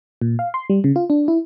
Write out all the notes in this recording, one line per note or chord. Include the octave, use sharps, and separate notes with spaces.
A#2
F5
C6
G3
C#3
F4
D4
E4